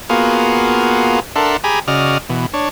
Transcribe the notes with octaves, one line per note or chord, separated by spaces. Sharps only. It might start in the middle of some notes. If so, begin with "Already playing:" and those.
A#3 B3 F4 F#4 G#4
D4 A4 A#4 E5 F#5 C6
G4 G#4 G#5 A#5 B5
C#3 F#4 D5 D#5 F6
B2 E3
D4 C#5